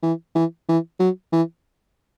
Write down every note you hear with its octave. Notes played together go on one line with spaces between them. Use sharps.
E3
E3
E3
F#3
E3